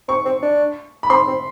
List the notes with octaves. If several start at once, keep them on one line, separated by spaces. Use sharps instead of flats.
C4 C#6
C4
D4
B5
C4 C6
C4